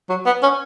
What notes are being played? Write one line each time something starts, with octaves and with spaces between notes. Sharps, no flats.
F#3
B3
C#4